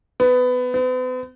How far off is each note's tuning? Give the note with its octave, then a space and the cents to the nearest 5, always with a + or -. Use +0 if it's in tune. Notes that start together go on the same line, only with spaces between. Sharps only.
B3 +20
B3 +45